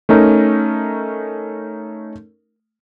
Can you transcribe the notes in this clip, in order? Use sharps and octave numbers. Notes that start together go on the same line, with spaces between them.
A3 C#4 D#4 A#4